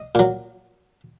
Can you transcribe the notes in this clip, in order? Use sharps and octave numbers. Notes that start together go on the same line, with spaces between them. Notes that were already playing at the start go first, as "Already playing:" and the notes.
Already playing: D#5
A#2 F#3